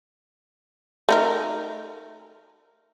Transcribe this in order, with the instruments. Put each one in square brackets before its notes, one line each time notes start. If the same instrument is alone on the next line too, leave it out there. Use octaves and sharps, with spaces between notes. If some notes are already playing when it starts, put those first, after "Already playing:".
[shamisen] A3 D#4 A#4